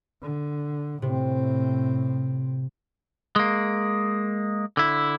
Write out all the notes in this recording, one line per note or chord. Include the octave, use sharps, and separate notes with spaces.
D3
A2 C3 C4
G#3 A#3
D3 E4